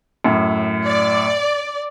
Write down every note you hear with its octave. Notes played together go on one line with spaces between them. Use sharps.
F#2 A2
D5